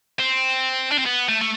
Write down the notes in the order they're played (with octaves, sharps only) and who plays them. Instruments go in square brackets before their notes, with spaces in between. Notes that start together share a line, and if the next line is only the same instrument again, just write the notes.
[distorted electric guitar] C4
D4
C4
B3
A3
A3